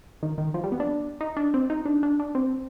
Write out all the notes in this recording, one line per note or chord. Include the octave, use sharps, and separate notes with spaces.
D#3
D#3
F3
G3
B3
D4
D#4
D4
C4
D#4
D4
D4
D4
C4